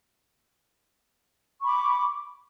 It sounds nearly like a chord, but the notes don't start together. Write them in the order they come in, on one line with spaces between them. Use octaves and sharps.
C#6 B5 D6